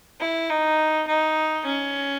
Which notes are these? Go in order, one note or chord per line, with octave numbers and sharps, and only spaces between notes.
E4
D#4
D#4
C#4